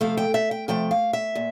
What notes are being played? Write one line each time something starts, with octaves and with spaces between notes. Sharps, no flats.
C3 F3 A3 F5
G5
E5
G5
C3 F3 A3 G5
F5
E5
A#2